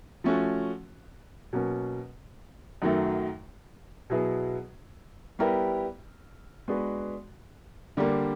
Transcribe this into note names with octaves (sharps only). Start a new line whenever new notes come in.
F3 A3 C#4 F#4
B2 F#3 A#3 C#4
F#2 D#3 F#3 A3
B2 F#3 B3 E4 G#4
G3 B3 E4 G4 A#4
G#3 B3 D4 F#4 B4
D3 G3 A#3